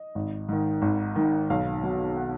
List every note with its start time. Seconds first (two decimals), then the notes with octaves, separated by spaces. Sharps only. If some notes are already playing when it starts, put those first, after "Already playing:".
Already playing: D#5
0.15 G#1
0.49 G#2 D#3
0.82 G#1
1.16 G#2 D#3
1.50 B1 F5
1.83 B2 F#3
2.16 F#5